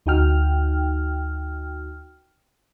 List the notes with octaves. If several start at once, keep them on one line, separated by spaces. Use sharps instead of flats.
D2 D#4 F#4 G5 F6